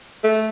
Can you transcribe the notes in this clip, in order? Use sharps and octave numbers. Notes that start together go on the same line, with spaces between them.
A3